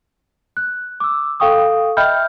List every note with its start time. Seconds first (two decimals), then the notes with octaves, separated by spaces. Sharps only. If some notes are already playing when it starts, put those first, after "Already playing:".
0.57 F#6
1.00 D6 E6
1.40 A4 F5 G5 C#6 D#6
1.97 D#5 E5 G5 B5 F6 G6